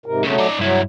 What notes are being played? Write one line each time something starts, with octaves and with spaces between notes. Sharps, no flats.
G#2 C3 A#4
B1 C#3 F#3 A3
D#4 D5
G2 F#3 E4